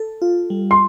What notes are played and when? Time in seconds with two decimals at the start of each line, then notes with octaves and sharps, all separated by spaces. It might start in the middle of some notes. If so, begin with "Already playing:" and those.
Already playing: A4
0.22 F4
0.50 G3
0.71 C6